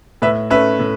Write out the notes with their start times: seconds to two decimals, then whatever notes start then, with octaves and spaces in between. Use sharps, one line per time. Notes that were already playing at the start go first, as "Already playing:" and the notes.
0.22 A2 B4 E5
0.50 C#4 B4 E5
0.54 A3
0.79 A2